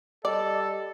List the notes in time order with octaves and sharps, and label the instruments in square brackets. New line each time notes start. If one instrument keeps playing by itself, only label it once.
[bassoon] G3 [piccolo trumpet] A4 [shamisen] D5 [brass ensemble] D#5